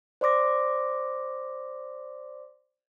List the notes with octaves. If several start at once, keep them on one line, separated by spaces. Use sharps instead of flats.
C5 D5 C6 D6 A#6